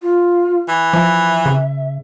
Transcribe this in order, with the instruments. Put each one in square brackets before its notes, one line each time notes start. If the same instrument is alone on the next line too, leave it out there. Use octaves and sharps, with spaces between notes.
[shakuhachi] F4
[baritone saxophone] E3
[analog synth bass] F3 [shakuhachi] E5
[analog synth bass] C#3